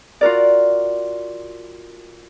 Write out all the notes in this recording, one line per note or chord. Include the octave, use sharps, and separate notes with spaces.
F4 F#4 A#4 D5